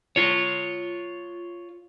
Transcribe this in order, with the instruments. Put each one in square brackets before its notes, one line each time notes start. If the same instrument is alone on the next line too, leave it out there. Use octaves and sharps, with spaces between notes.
[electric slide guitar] F4 C#5